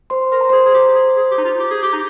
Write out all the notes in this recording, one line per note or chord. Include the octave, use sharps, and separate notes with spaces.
C5 C6
A#4 C6
A#5
G#4 C5 C6
G#4
G4
G#4
G#4
G4
D#4
F4
G4
G#4
G4
D#4